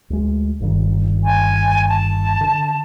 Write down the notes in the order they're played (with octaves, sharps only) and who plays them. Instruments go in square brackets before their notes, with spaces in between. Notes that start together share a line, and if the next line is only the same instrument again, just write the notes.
[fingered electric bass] D2 G#3
G1 G2 D#3
[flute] G#5
A5
[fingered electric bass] D3